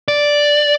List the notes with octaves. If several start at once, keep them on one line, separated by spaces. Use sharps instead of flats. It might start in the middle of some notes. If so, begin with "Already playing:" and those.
D5